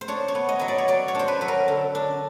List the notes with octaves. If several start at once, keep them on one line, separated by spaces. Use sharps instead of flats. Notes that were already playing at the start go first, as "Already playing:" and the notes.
C5
D4 C#5
C#5
B3
D#5
F#3 D#5
D5
C#5
F#3 D5
C#5
D4 C5
B4
F#3 B4
A#4
D3
D4